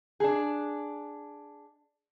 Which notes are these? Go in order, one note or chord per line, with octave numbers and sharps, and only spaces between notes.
D4 G#4